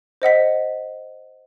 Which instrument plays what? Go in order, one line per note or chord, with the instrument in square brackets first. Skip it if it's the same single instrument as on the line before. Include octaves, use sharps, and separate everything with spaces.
[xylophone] C5 D#5 F#5 B6